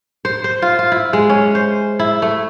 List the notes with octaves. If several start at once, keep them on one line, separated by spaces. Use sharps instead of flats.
C5
C5
F4
F4
E4
G#3
C#4
C5
E4
A3